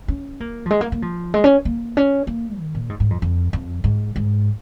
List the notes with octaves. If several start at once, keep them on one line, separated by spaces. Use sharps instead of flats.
C#4
A#3
F3
G#3
A#3
A#3
F3
G#3
C#4
A#3
C#4
A#3
D#3
A#2
G#2
G#2
F2
F2
F2
G#2
G#2